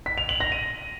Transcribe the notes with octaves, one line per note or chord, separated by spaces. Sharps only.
B6
F7
F#7
A#6
D#7